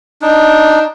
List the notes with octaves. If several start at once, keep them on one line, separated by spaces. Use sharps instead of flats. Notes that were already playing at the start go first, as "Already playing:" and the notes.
D4 D#4